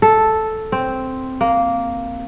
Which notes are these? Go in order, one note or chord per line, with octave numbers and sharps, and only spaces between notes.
A4
C4
A#3